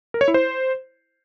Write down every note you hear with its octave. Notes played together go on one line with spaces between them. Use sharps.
A#4
C#5
E4
C5